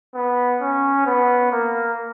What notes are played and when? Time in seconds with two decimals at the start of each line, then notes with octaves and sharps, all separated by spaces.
0.15 B3
0.61 C#4
1.06 B3
1.52 A#3